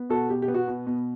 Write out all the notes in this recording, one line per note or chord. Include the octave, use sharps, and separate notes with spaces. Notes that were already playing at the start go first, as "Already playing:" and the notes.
Already playing: B3
B2 F#4 A4
B2 G4
G4
B3
F#4
B2
B2